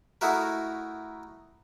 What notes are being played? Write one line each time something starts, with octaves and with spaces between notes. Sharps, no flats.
A3 D#4 E4 F#4 A#4